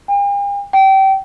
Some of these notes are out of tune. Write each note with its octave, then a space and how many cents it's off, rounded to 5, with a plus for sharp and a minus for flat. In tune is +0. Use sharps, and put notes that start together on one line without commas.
G5 +45
G5 -25